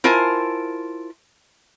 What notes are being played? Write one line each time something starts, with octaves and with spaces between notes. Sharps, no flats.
E4 F4 A#4 C5 G#5 A5